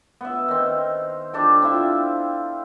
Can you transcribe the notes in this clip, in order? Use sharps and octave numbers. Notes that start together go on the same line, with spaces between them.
B3 E5
D#3 C4
D4 G4 A4 G5
C4 E4 F4 E5